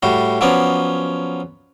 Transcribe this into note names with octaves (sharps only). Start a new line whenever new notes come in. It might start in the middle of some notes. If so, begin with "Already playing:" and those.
A2 G3 F#4
F3 F#3 B3 C#4 D5